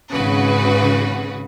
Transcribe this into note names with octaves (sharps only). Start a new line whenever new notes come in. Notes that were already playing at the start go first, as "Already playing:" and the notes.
G#1 C#3 F#4 B4